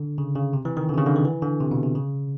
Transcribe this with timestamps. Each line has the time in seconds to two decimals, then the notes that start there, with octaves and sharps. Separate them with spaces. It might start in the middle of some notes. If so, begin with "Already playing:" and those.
Already playing: D3
0.18 C#3
0.35 C#3
0.53 C3
0.65 E3
0.77 D#3
0.89 D3
0.94 C3
0.98 C#3
1.06 D3
1.16 D#3
1.24 E3
1.42 D3
1.60 C3
1.71 B2
1.83 C3
1.95 C#3